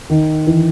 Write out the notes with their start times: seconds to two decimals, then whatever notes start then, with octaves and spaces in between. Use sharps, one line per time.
0.10 D#3
0.47 E3